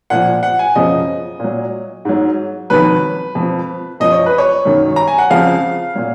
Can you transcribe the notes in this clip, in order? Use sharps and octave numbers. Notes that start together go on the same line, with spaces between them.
A#2 F3 F#5
F#5
G#5
F#2 C#3 F3 D#5
A#2 F#3
G#2 F#3
F2 D#3 F#3 B4
F2 F3
F#2 F3 D#5
C#5
B4
C#5
F#2 D#3 F#3
A#5
G#5
F#5
F2 C#3 F3 F5
A#2 F#3